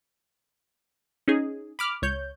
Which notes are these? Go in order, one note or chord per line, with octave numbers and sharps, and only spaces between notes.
C#4 D#4 G#4
B5 D6 F6
C#2 C#5 G6